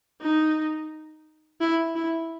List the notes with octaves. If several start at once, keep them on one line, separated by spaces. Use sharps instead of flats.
D#4
E4
E4